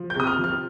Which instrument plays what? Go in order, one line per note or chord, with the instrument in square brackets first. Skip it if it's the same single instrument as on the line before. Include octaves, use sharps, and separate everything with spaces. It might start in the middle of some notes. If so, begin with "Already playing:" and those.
Already playing: [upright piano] F3
G6
C3 D#6
F6
F3
F6